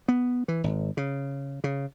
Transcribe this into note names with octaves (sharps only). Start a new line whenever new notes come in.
B3
E3
G#1
C#3
C#3